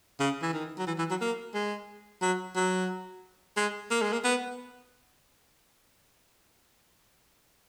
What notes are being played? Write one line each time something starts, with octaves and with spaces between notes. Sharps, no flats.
C#3
E3
D#3
F#3
E3
E3
F#3
A#3
G#3
F#3
F#3
G#3
A#3
G#3
A#3
B3